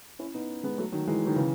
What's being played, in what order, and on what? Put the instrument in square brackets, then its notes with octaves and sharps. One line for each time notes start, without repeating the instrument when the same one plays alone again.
[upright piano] C#4 E4
B3 D#4
G#3 B3
F#3 A3
D#3 F#3
E3 G#3
D#3 F#3
C#3 E3